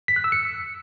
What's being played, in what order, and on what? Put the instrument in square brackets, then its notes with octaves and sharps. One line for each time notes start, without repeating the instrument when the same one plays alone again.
[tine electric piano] B6
F#6
E6
C#7